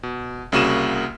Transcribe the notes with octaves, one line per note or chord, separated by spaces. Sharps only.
B2
C2 C#3 A#3 F#4 D#7 E7